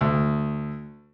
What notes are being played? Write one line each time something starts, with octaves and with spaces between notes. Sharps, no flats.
D2